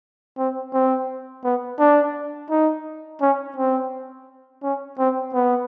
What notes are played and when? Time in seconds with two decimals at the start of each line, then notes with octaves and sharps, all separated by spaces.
0.38 C4
0.73 C4
1.44 B3
1.79 D4
2.50 D#4
3.22 C#4
3.57 C4
4.63 C#4
4.99 C4
5.34 B3